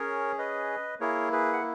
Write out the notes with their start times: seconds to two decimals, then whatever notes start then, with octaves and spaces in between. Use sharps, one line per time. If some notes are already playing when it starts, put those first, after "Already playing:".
Already playing: C#4 G#4 A#4 C#5
0.38 B4 D#5
1.00 A#3 E4 G#4 A#4 C#5
1.32 G#4 B4
1.53 F#5